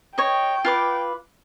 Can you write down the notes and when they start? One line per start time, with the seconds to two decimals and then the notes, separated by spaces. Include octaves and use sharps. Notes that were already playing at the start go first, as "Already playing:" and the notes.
0.18 C#5 D#5 G5
0.65 F4 B4 D6